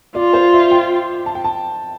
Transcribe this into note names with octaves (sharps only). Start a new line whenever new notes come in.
F4 D5
C5
E5
G5
A5
G5
A5